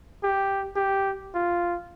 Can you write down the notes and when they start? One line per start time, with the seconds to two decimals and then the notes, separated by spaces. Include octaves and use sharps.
0.23 G4
0.76 G4
1.35 F4